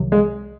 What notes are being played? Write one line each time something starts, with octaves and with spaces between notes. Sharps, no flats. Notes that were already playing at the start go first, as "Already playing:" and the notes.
Already playing: C2 C3 D#3 F#3
G#3